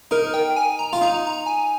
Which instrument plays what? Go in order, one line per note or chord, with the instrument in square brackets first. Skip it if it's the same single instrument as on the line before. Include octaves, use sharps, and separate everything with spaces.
[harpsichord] D#4 [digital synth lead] A#4
[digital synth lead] G5
G#5
A#5
[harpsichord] F4
[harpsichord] D#4 [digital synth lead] A#5
[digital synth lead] A#5
G#5